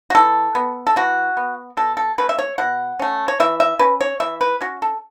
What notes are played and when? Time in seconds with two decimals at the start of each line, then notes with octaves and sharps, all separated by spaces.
0.10 F#4
0.15 E3 A4
0.55 B3
0.87 A4
0.96 E3 F#4
1.37 B3
1.77 B2 A4
1.97 A4
2.18 A3 C#4 B4
2.29 E5
2.39 C#5
2.58 B2 F#5
2.99 A3 C#4
3.28 C#5
3.40 E3 E5
3.60 E5
3.79 C#4 B4
4.01 C#5
4.20 E3 E5
4.41 B4
4.61 C#4 F#4
4.82 A4